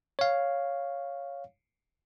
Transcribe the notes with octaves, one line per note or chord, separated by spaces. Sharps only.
C#5 F5